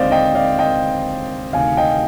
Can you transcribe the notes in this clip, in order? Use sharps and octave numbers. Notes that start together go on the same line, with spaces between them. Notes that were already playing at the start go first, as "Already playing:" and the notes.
Already playing: D#2 D3 G#3 C4 C5 D5 D#5 F5
D#5 G5
D5 F5
D#5 G5
D2 C3 D#3 F5 G#5
D#5 G5